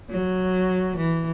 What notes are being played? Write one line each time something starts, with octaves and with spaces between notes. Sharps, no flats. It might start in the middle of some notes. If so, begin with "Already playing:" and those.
F#3
E3